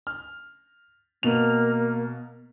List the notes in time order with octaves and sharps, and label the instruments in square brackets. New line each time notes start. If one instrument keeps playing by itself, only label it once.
[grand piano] F6
[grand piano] B2 F7 [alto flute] A#3